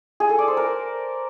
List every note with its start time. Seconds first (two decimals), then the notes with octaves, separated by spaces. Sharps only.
0.20 G#4
0.29 A4
0.39 D5
0.48 C5
0.57 A#4